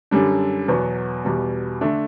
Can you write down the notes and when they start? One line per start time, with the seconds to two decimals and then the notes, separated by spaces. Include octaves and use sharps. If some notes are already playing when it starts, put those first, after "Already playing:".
0.11 F#2 D3 G3 D4
0.68 E2 B2 F#3 B3
1.25 E2 B2 G3
1.81 D3 A3 D4